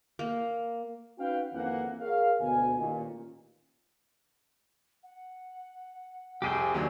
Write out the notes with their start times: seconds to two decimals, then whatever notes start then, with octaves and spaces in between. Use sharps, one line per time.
0.19 A#3
1.18 C#4 D#4 F#4 B4 F5 G5
1.53 G#1 F2 E3 A#3 F#5
2.00 G#4 A#4 C#5 F5
2.40 D2 B2 G#5
2.77 A1 A#2 D#3
5.03 F#5
6.42 C2 F2 G4 G#4 G5 E6
6.74 D#2 F#3 D4 G#5